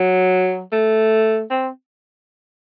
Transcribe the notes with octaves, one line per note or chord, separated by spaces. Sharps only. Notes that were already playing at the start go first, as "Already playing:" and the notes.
Already playing: F#3
A3
C4